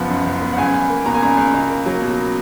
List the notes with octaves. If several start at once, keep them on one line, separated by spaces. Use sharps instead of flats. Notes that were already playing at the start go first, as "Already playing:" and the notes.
Already playing: F#1 F3 B3 F#5
F#2
F#1
B3
F#5
C#2 G#5
C#2
A#3
B2 A#5
G#5
C#2 A#5
C#2
C#2
A#3
F#3
B2